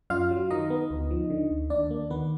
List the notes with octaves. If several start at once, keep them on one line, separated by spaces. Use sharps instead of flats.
F#2 F4 F5
F#3
D#3 D#4 D#5
B3
D2
F3
D3
D2
D#2 D4 D5
A#3
D#3 B3 B4